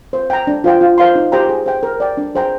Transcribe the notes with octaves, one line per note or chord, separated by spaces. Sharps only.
C5
G5 A#5
D4
F4 C5 G5
F4
C5 F5 C6
D#4
G4 C5 G5 A#5
G#4
C5 G5
A#4
D5 G5
D4
G#4 C5 G5 A#5